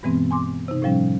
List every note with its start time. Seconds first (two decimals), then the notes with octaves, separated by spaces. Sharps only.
0.03 G2 B2 E3 G#3 B3 C4
0.31 G#5 C6 D6
0.68 C3 D#4
0.82 A2 C3 F3 G3 C#4